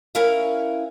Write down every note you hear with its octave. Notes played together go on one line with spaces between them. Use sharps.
C#4 E4 A#4 B4 E5 F5